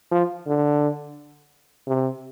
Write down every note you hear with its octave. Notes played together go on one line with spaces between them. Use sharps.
F3
D3
C3